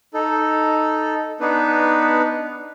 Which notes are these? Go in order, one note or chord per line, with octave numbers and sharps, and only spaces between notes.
D#4 A4
B3 D4 D#4 B4